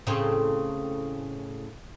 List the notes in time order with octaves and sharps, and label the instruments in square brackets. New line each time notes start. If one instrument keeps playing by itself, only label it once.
[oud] A2 C#3 C4